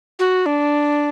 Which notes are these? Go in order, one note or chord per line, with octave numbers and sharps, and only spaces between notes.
F#4
D4